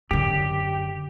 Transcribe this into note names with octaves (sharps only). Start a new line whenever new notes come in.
F#2 D3 G4